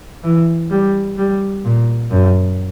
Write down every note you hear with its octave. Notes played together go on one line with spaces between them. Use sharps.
E3
G3
G3
A#2
F#2